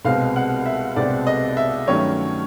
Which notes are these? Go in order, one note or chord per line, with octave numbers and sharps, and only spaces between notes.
C2 B2 G#3 C4 F5
F#5
E5
C2 B2 G#3 C4 D5
D#5
E5
G2 D#3 F#3 A3 C#4 C#5